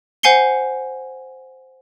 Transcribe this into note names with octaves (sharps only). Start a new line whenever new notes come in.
C5 F#5 G#5 C7 C#7 G7